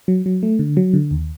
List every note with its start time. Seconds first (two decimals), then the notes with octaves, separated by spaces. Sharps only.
0.08 F#3
0.26 F#3
0.43 A3
0.59 D3
0.77 F#3
0.94 D3
1.11 D#2